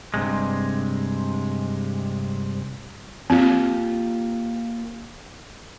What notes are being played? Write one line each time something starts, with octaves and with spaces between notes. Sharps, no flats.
G2 C3 G#3
A#3 C4 F4 G4